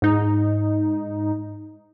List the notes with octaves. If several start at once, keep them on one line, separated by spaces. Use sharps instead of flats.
G#2 D#4